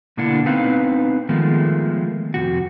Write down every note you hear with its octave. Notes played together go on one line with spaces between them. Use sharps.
B2 D3 A#3 D4 E4 F#5
B3 C4 D#4 B4 F5
D#3 F3 G#3 A3 B3
F2 C3 F#4